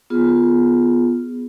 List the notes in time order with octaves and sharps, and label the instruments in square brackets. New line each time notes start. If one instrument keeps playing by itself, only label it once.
[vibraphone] B3 F4 G#4